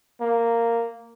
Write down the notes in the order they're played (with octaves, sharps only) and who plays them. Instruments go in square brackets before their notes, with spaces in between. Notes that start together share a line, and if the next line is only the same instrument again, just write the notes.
[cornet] A#3